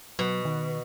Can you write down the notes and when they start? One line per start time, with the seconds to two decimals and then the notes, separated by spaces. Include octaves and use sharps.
0.19 B2 F#3
0.45 D#3